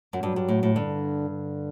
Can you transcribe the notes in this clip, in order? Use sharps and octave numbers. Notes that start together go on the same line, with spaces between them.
F#2
G2 F#3
G2
A2
A2
G2 D3
D3